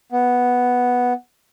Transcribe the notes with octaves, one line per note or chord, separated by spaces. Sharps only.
B3